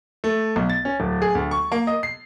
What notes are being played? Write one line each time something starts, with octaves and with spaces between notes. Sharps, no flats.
A3
B1
A6
C#4
D1
G#4
D2
C#6
A#3
D#5
C7